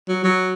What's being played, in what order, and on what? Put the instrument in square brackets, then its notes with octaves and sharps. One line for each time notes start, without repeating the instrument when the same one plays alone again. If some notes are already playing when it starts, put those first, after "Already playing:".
[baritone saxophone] F#3
F#3